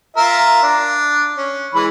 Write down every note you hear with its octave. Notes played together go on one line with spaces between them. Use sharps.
F4 A#4 E5
D4
C#4
E3 G#3 B5